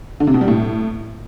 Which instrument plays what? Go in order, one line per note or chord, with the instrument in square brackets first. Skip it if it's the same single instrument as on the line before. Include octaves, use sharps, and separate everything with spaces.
[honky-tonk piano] D3
C3
B2
G3
A2